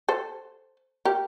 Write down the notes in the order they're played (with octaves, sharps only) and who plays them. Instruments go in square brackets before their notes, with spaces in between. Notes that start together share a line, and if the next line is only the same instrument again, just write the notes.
[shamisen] A4 C5
G4 A#4